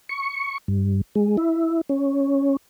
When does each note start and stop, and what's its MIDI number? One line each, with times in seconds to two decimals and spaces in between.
0.09 0.58 85
0.68 1.01 43
1.15 1.37 56
1.37 1.81 64
1.89 2.56 61